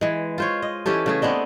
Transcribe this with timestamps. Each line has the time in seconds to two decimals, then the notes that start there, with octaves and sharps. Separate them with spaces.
0.01 E3 G#3
0.38 F4 C5 C#5
0.62 D#5
0.86 E3 C#4 G4 A4
1.06 C#3 A3 G#4
1.22 B3 C4 D4 D#5